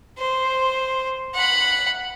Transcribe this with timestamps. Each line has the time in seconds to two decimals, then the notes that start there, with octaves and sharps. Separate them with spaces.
0.18 C5
1.34 F#5 B5